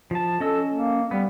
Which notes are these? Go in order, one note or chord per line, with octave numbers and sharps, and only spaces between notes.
F3 A5
C#4 A4 D#5 E6
A#3
G3 B3